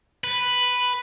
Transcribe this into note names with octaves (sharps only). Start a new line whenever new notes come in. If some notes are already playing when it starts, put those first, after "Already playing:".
B4